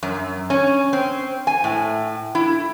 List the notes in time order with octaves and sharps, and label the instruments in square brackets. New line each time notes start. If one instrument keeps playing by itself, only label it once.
[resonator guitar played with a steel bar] F#2
C#4
C4
G#5
A2
E4